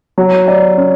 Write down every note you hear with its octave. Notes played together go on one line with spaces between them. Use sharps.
F#3
D5
C#4